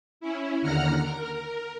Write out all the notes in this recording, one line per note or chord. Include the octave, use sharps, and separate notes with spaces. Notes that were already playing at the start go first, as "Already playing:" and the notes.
C#4 E4
D#2 D3 F#5 A#5 F6
A#4